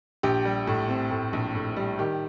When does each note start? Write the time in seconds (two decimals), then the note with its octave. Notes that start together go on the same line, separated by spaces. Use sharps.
0.23 A#1 G4
0.45 G3
0.67 A2
0.89 C4
1.11 A2
1.33 A#1
1.55 A2
1.76 G3
1.99 D#3 G4